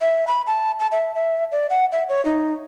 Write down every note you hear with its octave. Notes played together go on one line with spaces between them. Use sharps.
E5
B5
A5
A5
E5
E5
D5
F#5
E5
C#5
D#4